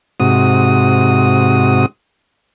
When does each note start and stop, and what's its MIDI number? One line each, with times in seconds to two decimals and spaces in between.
0.20 1.86 44
0.20 1.86 48
0.20 1.86 66
0.20 1.86 87